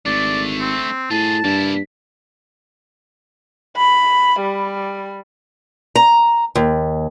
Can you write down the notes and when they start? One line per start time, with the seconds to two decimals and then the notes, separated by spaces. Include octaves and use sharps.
0.06 G#1 A3 D4 D5
0.60 C4
1.11 A2 F4 G#4 A5
1.44 G2 A#3 E4
3.77 B5
4.40 G3
5.96 A#5
6.55 D#2